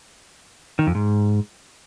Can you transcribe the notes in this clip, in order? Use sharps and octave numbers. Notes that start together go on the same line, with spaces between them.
D#3
F2
G#2